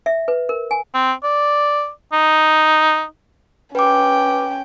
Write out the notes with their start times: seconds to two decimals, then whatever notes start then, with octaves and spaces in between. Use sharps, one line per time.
0.06 E5
0.28 B4
0.49 A#4
0.71 G#5
0.94 C4
1.23 D5
2.13 D#4
3.75 C#4 B4 G5 D6